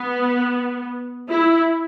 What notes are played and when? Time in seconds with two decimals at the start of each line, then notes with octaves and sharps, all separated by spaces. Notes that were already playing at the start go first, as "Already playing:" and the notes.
Already playing: B3
1.29 E4